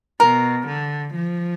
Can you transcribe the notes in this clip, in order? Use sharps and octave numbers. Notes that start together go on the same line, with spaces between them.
B2 A#4
D3
F3